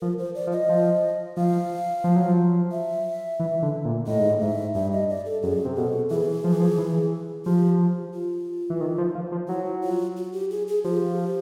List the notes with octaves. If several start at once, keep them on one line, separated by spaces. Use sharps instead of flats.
F3 A#4
C5
D5
F3
D#5
F3
F3 F5
F3
F#3
F3
E5
E3
D3
A#2
A2 D#5
G#2
A2
G#2 E5
G2 E5
D#5
D5
A4
F#2 G#4
C3
B2 A4
E3 G#4
F3
E3
F3
E3
F3 G4
F4
E3
D#3
F3
F3
F3
F#3 E4
F4
F#4
G4
G#4
G#4
F3 G4